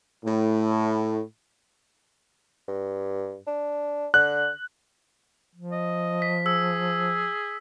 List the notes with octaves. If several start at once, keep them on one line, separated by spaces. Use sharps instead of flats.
A2
G2
D4
D3 F#6
F3
D#5
B6
G#4 E6